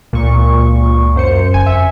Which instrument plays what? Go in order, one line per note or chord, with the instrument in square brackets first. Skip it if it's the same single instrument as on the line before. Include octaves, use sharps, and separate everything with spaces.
[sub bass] C#2 [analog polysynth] A#2 C#6
[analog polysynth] F#2 C5 C#7
[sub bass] F#1 [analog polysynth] G#5
[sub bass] F2 [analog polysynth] E5